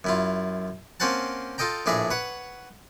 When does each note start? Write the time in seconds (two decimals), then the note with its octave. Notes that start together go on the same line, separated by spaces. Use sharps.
0.04 F#2 E4 F4
1.00 A#3 C4 C#4 C5 F#5 A5
1.58 F4 A4 D#5 G5 A#5
1.86 A#1 A2 D4 G#4 E5 A#5
2.10 B4 C#5 F#5